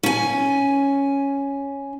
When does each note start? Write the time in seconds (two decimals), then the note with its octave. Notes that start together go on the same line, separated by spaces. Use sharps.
0.03 C#4 G#5